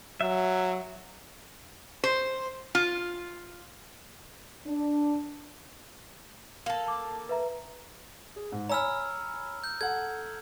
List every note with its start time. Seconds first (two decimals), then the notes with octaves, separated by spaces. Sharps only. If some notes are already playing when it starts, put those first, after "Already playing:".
0.21 F#3 E5
2.04 C5
2.75 F4
4.67 D4
6.66 A#3 A4
6.86 A5 D6
7.29 B4 E5 A#5
8.36 G#4
8.52 G#2
8.69 C#5 G#5 A#5 B5 E6 F6
9.64 G6
9.81 A4 F#5 G#6